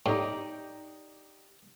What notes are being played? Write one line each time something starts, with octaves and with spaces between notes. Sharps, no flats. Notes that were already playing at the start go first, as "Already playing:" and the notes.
A2 D#4 G4 D5